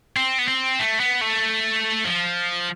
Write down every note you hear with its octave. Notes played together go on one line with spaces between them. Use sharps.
C4
B3
C4
A3
B3
A3
F3